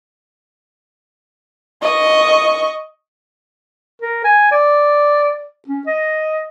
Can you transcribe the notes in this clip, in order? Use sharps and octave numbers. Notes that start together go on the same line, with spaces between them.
D#5 C#6
A#4
G#5
D5
C#4
D#5